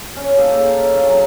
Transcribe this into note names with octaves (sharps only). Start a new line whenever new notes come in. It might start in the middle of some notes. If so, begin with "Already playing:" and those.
C#4
A#3 D#4 G#4 A4
A4
G#4 C#5 F5
F#3